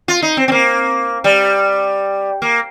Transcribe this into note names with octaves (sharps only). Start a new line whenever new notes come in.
F4
D#4
C4
C4
A#3
G3
A#3